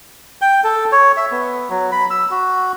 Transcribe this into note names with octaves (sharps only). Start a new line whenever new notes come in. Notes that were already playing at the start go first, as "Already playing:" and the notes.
G5
A4
C#5
E5
B3
F#3
B5
E6
F#4